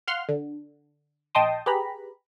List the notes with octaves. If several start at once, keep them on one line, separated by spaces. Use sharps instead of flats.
F5 F#5 C6 F6
D3
A#1 D#5 G5 A5 C6 D#6
G4 G#4 B4 A#5 B5